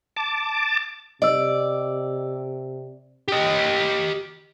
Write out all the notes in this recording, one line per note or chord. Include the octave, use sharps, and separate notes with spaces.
A5 D6
C3 D5 D#5 E6
G4 D#5